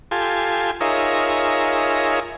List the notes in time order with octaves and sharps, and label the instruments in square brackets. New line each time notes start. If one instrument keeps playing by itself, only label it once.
[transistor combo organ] F4 G4 A4 G#5 C6
D#4 F4 G#4 A#4 C#5 E5